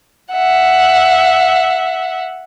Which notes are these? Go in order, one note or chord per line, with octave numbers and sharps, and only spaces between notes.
E5 F#5